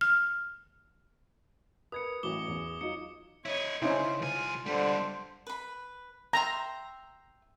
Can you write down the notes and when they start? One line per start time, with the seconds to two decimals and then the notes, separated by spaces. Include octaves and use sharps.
0.01 F6
1.92 A#4 B4 D#6 G#6 C#7
2.23 A1 E3 F#3 D6 G7
2.48 E2
2.81 F#3 D#4 F4 C#7
3.46 E4 C#5 D#5
3.82 C#3 C#4 D#4 E4 C5
4.22 C2 F4 G#5
4.66 C#2 D3 G3 C5
5.47 B4 B5
6.33 E5 G5 A#5 C6